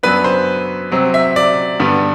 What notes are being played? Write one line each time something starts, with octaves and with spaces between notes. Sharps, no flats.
F#2 F#3 B3 D4 B4
C5
C3 F#3 C4
E5
D5
G2 D3 G3 B3